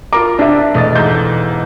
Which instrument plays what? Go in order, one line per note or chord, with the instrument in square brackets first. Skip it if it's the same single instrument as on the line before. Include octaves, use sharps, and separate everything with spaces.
[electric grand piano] F4 A#4 A#5 [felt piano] D6
[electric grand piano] C3 [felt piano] D4 E5
[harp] E1 [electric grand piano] A3 D#6 A6
[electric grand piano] G#2 A4 A#5 [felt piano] G6